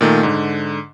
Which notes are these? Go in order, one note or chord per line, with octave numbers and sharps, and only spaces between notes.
A#2 D#3 A3
G#2 D3